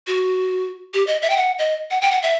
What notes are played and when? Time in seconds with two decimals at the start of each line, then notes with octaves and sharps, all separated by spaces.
0.07 F#4
0.94 G4
1.07 D#5
1.22 E5
1.30 G5
1.36 F#5
1.59 D#5
1.91 F#5
2.02 G5
2.11 F#5
2.23 E5